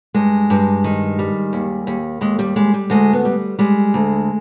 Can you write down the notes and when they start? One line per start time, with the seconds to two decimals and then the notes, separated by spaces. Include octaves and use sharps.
0.14 G2 G#3
0.50 G2
0.84 D#3
1.19 G3
1.53 D#2
1.87 D#2
2.21 D#2 G#3
2.39 G3
2.56 G3 G#3
2.74 G3
2.90 D2 G#3
3.13 B3
3.25 G3
3.59 G3 G#3
3.94 D2